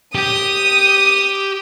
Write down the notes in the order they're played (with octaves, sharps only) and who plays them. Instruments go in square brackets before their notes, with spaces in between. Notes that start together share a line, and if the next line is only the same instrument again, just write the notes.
[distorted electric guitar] G4 [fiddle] D#6